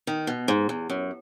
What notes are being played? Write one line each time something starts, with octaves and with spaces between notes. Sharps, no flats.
D#3
B2
G#2
E2
F#2